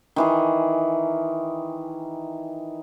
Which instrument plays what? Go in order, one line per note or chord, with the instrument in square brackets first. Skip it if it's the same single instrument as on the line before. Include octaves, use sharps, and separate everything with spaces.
[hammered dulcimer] D#3 E3 G#4